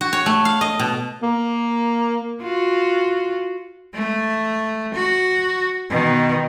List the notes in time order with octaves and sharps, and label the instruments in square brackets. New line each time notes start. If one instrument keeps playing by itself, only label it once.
[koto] F#4
C#5
A3
F5
D#5
B2
[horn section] A#3
[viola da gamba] F4 F#4
[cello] A3
F#4
B2 D#3